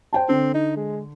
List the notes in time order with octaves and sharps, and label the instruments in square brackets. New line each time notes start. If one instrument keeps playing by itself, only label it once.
[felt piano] C5 G5 A5
[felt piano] D3 [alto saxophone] C4
[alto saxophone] D#4
G#3